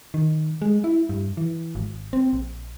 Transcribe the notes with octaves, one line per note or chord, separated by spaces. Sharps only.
D#3
G#3
E4
G2
E3
G#1
C4
A#1